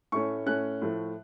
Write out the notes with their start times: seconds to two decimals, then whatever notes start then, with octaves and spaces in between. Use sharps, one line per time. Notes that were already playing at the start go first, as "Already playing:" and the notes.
0.12 A2 A3 C#4 C#6
0.46 A2 A3 C#4 F#6
0.82 A2 F3 A3